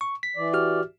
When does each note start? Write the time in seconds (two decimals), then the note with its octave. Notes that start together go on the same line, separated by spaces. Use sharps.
0.01 C#6
0.23 B6
0.36 E3 D5
0.54 F#4 G4 F6